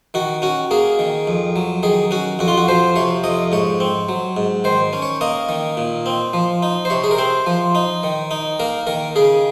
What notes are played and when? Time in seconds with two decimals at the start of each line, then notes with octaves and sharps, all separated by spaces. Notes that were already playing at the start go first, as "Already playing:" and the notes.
0.14 D#3 F#4
0.42 C#4 F#4
0.71 A#3 G#4
0.99 D#3
1.27 F2
1.56 F#3
1.83 D#3 G#4
2.11 C#4 F#4
2.39 F2 F#4
2.48 F4
2.58 F#4
2.68 F3 C5
2.96 C3 C#5
3.24 F2 D#5
3.52 G#2 C#5
3.80 C4
4.09 F#3
4.37 G#2
4.64 D#3 C5
4.93 C#4
5.02 C#5
5.21 A#3 D#5
5.49 D#3
5.77 A#2
6.06 C4
6.33 F3
6.62 D#4
6.85 C5
6.90 C3 C#5
7.04 G#4
7.11 A#4
7.18 C4 C5
7.47 F3
7.75 D#4
8.03 D#3
8.31 D#4
8.60 A#3 A#4
8.87 D#3 A#4
9.16 C#3 G#4